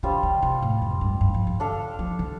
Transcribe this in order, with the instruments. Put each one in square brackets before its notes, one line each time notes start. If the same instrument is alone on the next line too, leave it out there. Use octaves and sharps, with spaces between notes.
[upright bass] D3 [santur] G3 F4 C5 F5
[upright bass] D3
C3
A2
F2
G2
G2
F3
D3
[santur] D4 A4 F5
[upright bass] F3
D3